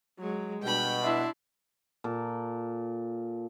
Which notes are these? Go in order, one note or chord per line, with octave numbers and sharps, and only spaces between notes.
F#3 G#3
B2 G3 D4 G5 B5
D4 E4 E5 C6
A#2 A4